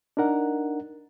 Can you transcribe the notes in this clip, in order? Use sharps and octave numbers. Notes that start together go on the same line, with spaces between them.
D4 D#4 A#4 F#5